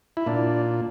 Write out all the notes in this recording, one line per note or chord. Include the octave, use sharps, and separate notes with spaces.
E4
A#2 D4